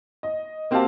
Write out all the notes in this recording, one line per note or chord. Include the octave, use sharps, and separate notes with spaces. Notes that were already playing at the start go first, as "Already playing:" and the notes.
D#5
A#3 C4 F#4 G4 F5 A5